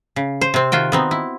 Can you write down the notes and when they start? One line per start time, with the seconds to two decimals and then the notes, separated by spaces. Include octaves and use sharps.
0.16 C#3
0.41 C5
0.54 C3 C4
0.72 D#3 F4 F#4 G5
0.92 B3 C4 D#4
1.11 E4